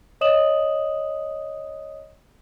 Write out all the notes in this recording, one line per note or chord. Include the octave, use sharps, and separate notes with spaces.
C#5 D#5 D#6 E7 F#7